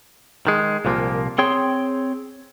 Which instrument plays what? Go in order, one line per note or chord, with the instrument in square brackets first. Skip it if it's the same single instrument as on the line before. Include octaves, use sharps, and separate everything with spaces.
[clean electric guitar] D#3 G#3
C2 A#2 F3 A3 A#3
C4 G#4 C#5 G5 C6